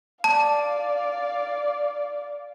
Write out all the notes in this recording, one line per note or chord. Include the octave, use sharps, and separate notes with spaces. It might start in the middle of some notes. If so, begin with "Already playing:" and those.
D5 F5 A5